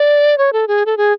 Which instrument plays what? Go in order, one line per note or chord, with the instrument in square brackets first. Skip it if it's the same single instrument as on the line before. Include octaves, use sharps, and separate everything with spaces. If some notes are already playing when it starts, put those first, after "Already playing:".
Already playing: [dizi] D5
C#5
A4
G#4
A4
G#4